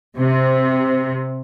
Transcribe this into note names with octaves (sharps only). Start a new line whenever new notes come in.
C3